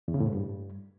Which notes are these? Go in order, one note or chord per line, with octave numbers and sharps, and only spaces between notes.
E2
C#3
A2
G#2
G2